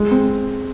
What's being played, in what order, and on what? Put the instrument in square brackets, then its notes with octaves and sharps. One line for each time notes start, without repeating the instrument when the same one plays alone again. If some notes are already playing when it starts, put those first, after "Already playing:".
Already playing: [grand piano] G#3
C4